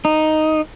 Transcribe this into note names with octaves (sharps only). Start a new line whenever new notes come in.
D#4